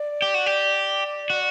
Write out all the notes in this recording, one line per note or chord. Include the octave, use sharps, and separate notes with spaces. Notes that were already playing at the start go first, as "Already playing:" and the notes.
Already playing: D5
G4
F#4
G4
F#4